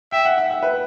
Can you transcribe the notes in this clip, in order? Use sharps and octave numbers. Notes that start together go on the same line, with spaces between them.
E5 G5
F#5
E5
E5
B4